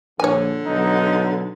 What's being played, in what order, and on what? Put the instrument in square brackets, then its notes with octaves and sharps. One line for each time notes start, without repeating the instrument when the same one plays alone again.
[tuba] A#1 [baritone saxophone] D3 [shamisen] C#5 G#5
[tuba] B1 [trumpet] D#4